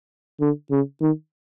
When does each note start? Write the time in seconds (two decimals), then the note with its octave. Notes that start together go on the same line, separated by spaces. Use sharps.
0.41 D3
0.71 C#3
1.01 D#3